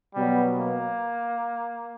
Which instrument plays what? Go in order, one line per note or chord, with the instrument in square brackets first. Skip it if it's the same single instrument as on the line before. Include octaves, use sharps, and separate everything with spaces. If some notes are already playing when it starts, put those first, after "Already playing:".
[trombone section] B2 F#3 B3 [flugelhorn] G3
[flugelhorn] A#3